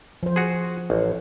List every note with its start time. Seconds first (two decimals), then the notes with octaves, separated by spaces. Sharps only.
0.23 F3 C5
0.36 F#4 G#4
0.90 A1